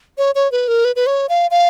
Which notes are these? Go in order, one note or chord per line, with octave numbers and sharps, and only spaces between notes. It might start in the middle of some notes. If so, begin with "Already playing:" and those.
C#5
C#5
B4
A#4
B4
B4
C#5
F5
F5